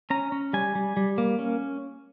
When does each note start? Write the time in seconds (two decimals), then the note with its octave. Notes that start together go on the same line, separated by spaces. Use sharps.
0.10 C#4 A#5
0.32 C#4
0.53 G3 G#5
0.75 G3
0.97 G3
1.18 A#3
1.39 C#4